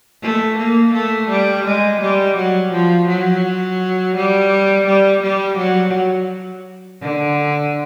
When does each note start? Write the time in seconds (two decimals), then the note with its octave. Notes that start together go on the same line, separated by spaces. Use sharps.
0.22 A3
0.58 A#3
0.94 A3
1.29 G3
1.65 G#3
2.01 G3
2.37 F#3
2.72 F3
3.08 F#3
4.16 G3
4.86 G3
5.22 G3
5.57 F#3
7.01 D3